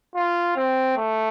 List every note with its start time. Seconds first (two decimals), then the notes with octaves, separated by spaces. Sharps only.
0.15 F4
0.56 C4
0.97 A3